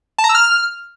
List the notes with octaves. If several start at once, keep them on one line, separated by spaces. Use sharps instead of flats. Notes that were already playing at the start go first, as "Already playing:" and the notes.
A5
A#5
E6
F6